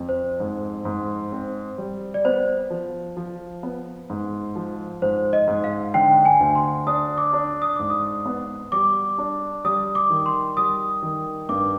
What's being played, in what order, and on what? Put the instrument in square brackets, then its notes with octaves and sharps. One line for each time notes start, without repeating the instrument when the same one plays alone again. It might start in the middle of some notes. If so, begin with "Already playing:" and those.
Already playing: [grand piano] F2
[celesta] C5
[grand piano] G#2
G#2
C4
G3
[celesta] D5
[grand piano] B3 [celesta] C5
[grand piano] F3
F3
B3
G#2
F3
[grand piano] G#2 [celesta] C5
[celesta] D#5
[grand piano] G#2
[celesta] F5
[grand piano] D3 [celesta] G5
[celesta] G#5
[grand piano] D2
[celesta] C6
[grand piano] D4 [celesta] D#6
[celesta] D6
[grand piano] D4
[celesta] D#6
[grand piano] G#2 [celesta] D6
[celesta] D#6
[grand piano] B3
[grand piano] G3 [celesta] D6
[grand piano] D4
[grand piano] G3 [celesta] D#6
[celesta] D6
[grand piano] D#3
[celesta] C6
[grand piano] G3 [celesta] D#6
[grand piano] D#3
[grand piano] G2 [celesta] D6